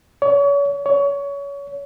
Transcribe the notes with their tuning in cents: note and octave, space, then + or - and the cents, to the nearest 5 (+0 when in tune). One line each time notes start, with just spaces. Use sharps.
C#5 +35
C#5 +25